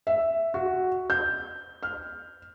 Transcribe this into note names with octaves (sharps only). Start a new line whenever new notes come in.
E5
F#4
G6
F6